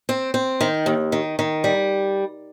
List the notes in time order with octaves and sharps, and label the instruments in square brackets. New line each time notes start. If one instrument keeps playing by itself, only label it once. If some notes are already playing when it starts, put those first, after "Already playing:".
[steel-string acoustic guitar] C4
C4
D#3
D#2
D#3
D#3
G3